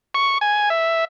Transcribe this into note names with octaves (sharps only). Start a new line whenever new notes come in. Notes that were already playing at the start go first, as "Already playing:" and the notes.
C#6
G#5
E5